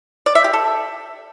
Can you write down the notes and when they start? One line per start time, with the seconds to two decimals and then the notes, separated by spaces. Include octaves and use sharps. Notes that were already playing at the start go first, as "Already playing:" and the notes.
0.26 D5
0.35 E5
0.44 G4
0.53 A4